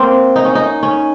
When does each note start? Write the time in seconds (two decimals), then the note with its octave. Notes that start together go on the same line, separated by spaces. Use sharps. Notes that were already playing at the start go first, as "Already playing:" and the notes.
Already playing: A#3 C4
0.36 D#4
0.45 C#4
0.55 D#4
0.83 C#4